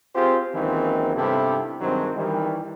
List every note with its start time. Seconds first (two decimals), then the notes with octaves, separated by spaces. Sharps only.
0.15 C4 F4 G4 G#4 C5
0.55 C#2 D#3 E3 F#3 A#3 C4
1.15 G2 C3 B3 E4 G4 A4
1.81 G2 D#3 F#3 G#3 C4
2.16 D#3 E3 G3